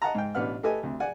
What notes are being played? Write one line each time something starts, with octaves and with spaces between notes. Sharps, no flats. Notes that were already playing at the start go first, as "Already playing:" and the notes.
D#5 F#5 A5 A#5
G#2 G5
A1 B2 D4 B4 F#5 F6
A3 G4 A4 B4 D#5 G#5
D2 C3
D5 F#5 G#5